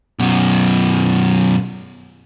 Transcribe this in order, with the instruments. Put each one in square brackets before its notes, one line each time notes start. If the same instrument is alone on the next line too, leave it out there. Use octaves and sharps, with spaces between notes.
[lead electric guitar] F#2 B2